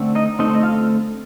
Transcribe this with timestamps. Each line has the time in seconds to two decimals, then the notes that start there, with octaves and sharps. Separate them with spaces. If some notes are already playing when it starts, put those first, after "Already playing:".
Already playing: D3 A3 C4
0.15 D#4 D#5
0.39 D3 A3 C4 D#4 D#5
0.55 D#5
0.63 F4 F5